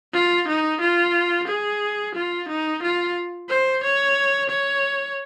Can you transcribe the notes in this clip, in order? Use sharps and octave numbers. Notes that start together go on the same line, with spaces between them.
F4
D#4
F4
G#4
F4
D#4
F4
C5
C#5
C#5